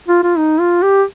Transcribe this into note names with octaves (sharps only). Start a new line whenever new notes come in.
F4
F4
D#4
F4
G4